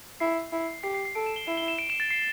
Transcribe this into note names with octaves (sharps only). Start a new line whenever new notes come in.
E4 C7
E4
G4 C7
C7
C7
A4 D7
E7
G7
E4 E7
G7
E7
D7
E7
A6
C7